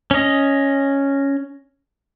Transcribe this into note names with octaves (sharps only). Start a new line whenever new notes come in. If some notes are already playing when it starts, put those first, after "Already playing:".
C#4 D#5